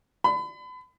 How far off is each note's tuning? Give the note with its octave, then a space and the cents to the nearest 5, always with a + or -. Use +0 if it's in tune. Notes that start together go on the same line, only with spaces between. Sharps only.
B5 +35